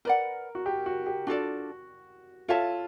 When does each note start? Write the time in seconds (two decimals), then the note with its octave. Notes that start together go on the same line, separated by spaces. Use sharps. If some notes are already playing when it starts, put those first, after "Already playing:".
0.05 A#4 B4 D5 F#5
0.55 F#4
0.66 G4
0.86 F#4
1.06 G4
1.27 D4 F4 F#4 A4 D5
2.48 F4 A4 C#5 E5 A5